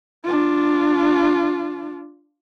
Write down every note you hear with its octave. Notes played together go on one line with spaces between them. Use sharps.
D4 F4